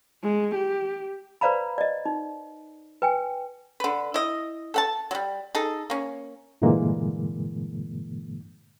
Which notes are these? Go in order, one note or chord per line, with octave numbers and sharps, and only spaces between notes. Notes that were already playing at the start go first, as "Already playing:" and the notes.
G#3
G4
B4 C5 D5 F5 A#5 B5
D5 D#5
D#4
B4 G5 G#5
D3 B4
E4 D#5
A4 F#5 A5
F#3 G3
D#4 G#4 A4
A#3 C#4
G2 A#2 D3 E3 G#3 A#3